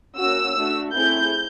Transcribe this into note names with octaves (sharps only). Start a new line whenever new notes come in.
A#3 C#4 F#4 E6
A3 D4 F#4
A3 C4 E4 G#4 G6